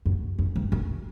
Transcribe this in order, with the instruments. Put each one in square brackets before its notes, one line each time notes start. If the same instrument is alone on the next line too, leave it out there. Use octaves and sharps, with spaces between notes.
[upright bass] F#2
F#2
G2
F#2